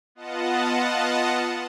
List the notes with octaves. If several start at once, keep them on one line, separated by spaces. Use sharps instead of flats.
B3 F4 D#5 F#5 A5